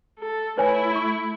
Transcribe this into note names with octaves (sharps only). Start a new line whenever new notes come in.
A4
A3 E4 B4 C#5 G#5
C#6